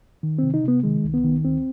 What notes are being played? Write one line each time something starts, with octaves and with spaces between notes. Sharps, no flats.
D#3
C3 C4
D#4
C3 B3
D#3 G#3
C2
B3
D#3
D2 C4